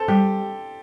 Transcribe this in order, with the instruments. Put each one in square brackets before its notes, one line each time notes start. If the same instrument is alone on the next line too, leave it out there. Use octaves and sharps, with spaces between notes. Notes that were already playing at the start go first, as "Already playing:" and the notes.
Already playing: [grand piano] A4 C5
[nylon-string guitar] G3 [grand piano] G4